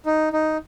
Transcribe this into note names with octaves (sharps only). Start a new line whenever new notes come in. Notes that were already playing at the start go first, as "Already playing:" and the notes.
D#4
D#4